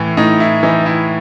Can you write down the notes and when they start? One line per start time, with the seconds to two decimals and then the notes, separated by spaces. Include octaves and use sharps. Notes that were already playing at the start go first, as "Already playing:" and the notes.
Already playing: A2 E3
0.17 A2 D#4
0.40 E4
0.63 E3 D#4
0.86 E4